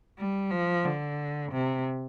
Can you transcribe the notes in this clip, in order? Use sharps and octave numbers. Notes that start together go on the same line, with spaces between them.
G3
F3
D3
C3